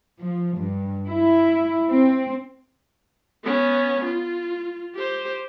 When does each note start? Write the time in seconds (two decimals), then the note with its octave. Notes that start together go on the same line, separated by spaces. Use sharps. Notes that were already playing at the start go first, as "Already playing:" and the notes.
0.20 F3
0.57 G2
1.08 E4
1.90 C4
3.44 B3 C#4
4.05 F4
4.95 G4 C5